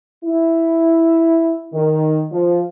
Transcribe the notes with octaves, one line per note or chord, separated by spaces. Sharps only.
E4
D#3
F3